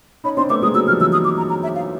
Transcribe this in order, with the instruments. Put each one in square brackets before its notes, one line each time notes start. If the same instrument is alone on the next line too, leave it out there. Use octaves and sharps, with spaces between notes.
[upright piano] C#4 D#4 [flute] B5
[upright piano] C4 D4 [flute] C6
[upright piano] A3 B3 [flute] D6
[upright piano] G#3 A#3 [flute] D#6
[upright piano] F#3 G#3 [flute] E6
[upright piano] F3 G3 [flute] F6
[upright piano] E3 F#3 [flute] E6
[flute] D#6
D6
A#5
A#5
E5
F5